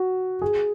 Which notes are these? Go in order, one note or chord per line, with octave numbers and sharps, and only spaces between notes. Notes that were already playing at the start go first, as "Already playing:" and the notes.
Already playing: F#4
G#4